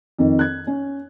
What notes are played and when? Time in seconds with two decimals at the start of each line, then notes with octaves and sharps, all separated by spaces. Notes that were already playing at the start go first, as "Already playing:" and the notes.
0.19 F2 D#3
0.39 F#6 G#6
0.67 C#4